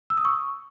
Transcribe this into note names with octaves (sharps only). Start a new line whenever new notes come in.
E6
D#6
C#6